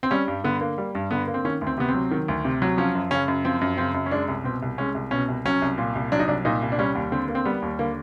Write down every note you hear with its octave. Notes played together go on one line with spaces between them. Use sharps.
C4
G3 C#4
G2
D3 B3
A#3
G3
G2
D3 B3
A#3
C4
D#3 C#4
D2
C4
C3 B3
C4
F#3
D#3
D2
C3
F#3
F3 C#4
F#2
C#3 C#4
F#2
F3 C4
F#2
C#3 C4
F#2
C#4
G#3 D4
C2
B2 C4
C2
G#3 C#4
C2
B2 C#4
C2
F#3 C#4
C2
A#2
C2
F#3 D4
D#4
C2 D4
A#2 D#4
C2
D4
G3 C#4
D#2
D3 C4
A#3
C4
G3 B3
D#2
D3 A#3